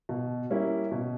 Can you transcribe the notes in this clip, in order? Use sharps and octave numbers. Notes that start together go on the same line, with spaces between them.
B2
G3 A#3 C#4 E4
B2